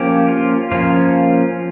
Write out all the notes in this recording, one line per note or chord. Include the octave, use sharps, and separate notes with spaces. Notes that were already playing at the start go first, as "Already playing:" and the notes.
Already playing: F3 A#3 C#4 G4
F4
F3 A#3 C#4 F4